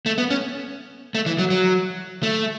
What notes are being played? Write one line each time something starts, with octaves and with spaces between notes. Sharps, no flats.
A3
B3
C#4
A3
E3
F#3
F#3
A3